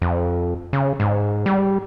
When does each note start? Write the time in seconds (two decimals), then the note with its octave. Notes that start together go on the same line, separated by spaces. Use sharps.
0.02 F2
0.73 C#3
1.00 G#2
1.46 G3